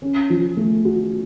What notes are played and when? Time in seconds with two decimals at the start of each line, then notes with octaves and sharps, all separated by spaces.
0.02 C#4
0.30 F3
0.57 A3
0.85 F#4